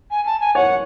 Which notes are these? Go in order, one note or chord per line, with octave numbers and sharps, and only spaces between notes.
G#5
A5
G#5
C#5 F#5